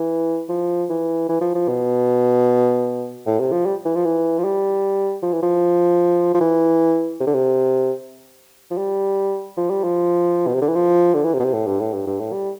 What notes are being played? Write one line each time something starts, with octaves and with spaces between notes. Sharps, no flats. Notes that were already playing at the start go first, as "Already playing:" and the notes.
Already playing: E3
F3
E3
E3
F3
F3
B2
A2
C3
F3
G3
E3
F3
E3
F3
G3
F3
E3
F3
F3
E3
C3
D3
C3
F3
G3
F3
G3
F3
B2
C3
D3
E3
F3
D3
E3
C3
B2
C3
A2
G2
A2
G2
G2
A2
G3